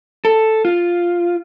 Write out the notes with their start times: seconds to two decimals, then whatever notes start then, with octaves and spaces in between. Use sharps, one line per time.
0.25 A4
0.65 F4